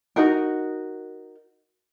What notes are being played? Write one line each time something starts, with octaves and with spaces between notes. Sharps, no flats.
D#4 F#4 A#4